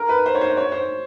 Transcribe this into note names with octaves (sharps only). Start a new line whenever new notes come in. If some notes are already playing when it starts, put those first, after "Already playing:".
Already playing: A#4
B4
C5
C#5
C5
C#5
C5